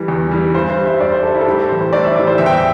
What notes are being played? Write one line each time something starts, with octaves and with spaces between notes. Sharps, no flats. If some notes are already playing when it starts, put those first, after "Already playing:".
Already playing: E3 G3
E2
E3 G3
G2 C5
C5
G3
E5
G2 D5
C5
G3 A4
E4
A4
A2 G4
A4
E3 G3 C5
C5
A2 D5
E5
E3 G3 D5
C5
E2 E5
G5
E5